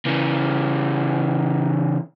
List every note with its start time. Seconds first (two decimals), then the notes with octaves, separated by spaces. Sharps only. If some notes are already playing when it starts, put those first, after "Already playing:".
0.05 C#3 E3